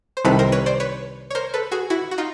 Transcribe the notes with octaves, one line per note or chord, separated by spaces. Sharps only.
C5
C2 C3 D#3 A4 B4
A#4 C5
B4 C#5
C5 D5
B4 C#5
C#5
A#4 C5
A4 B4
F#4 G#4
E4 F#4
F#4
D#4 F4